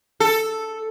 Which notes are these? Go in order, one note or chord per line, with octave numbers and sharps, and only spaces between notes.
A4